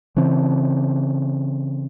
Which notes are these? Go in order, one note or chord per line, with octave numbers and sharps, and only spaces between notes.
C#3 E3 C4